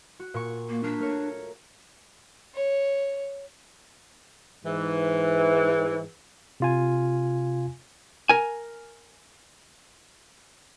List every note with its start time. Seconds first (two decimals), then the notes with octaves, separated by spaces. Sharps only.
0.20 F#4
0.34 A#2 C#6
0.69 A#3
0.83 A#3 D4 B6
0.99 A3 A#4 C#5
2.55 C#5
4.65 G#2 E3
6.60 C3 F4 G#5
8.29 A#4 G#5